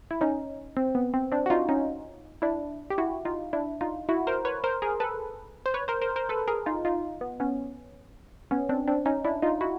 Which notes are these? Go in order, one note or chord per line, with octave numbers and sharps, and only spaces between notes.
E4
C#4 D#4
C4
B3
C4
C4 D4
F#4
D#4 F4
C#4 D#4
D4 E4
G4
E4 F#4
D#4 F4
D4 E4
D#4 F4
E4 F#4
A#4 C5
B4 C#5
A#4 C5
G#4 A#4
A4 B4
C5
B4 C#5
A#4 C5
A#4 C5
A#4 C5
A4 B4
G#4 A#4
D#4 F4
D#4 F4
B3
B3 C#4
B3 C#4
C4 D4
C4 D4
C#4 D#4
D4 E4
D#4 F4
E4 F#4